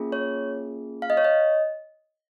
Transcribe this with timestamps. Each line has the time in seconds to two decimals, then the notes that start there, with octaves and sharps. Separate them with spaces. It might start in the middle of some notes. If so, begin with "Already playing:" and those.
Already playing: A#3 C#4 F4 G#4
0.12 C#5
1.02 F5
1.10 D#5
1.17 C#5
1.25 D#5